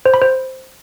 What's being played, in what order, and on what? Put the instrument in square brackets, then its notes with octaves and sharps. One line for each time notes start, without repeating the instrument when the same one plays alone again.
[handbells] C5
B5
C5